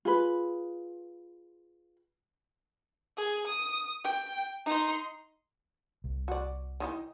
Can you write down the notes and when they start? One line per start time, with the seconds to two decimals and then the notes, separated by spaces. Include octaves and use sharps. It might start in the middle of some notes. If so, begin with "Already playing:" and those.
0.05 F4 G#4 B4
3.17 G#4
3.47 D#6
4.05 G5
4.66 D#4 C6
6.04 C2
6.28 F#4 D5
6.80 D#3 E3 D#4